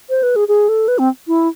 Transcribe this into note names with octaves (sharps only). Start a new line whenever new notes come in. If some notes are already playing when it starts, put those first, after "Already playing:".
C5
B4
G#4
G#4
A4
B4
C4
E4